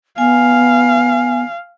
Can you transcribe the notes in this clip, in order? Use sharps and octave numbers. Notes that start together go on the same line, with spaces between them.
B3 F5 G#5